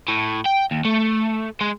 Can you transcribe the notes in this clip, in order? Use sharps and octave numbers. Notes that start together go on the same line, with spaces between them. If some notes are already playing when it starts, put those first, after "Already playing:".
A2
G5
D#2
A3
G#3